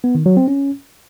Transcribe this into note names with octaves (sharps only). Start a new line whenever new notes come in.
B3
D#3
F#3
C4
C#4